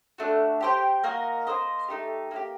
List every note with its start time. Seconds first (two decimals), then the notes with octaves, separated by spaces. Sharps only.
0.18 A3 D4 F#4
0.61 G4 C5 G5
1.03 A#3 F#4 A#4 D#5
1.47 A#3 F#4 C5 D#5
1.88 A3 D#4 G4
2.31 A#3 D4 G4